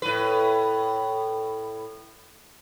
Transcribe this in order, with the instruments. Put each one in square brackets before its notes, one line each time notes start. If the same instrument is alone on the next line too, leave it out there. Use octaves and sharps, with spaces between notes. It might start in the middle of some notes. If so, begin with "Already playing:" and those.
[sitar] A2 B4